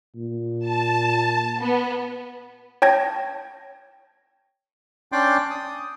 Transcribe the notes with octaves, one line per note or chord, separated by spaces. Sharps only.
A#2
A5
B3
C#5 G5 A5 G#6 A#6
C#4 D4 D5 G5 C6 D6
D#6